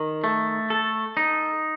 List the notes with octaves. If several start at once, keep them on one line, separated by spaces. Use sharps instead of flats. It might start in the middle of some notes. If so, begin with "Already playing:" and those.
Already playing: D#3
A3
A4
D#4